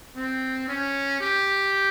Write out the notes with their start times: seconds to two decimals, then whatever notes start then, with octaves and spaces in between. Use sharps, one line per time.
0.16 C4
0.68 C#4
1.21 G4